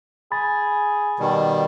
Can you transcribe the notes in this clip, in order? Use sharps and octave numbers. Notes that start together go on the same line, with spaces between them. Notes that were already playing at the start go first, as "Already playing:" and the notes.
G#4 B5 A6
B2 D#3 G3